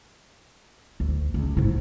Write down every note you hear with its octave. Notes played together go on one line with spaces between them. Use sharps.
D2
C#2
G#2 E4